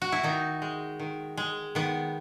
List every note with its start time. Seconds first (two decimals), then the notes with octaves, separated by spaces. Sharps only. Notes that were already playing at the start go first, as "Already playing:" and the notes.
0.02 F#4
0.12 E4
0.23 D#3 D#4
0.62 G#3
0.99 D#3
1.37 G#3
1.75 D#3 B3